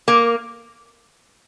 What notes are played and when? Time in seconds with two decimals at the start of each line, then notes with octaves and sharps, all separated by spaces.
0.08 A#3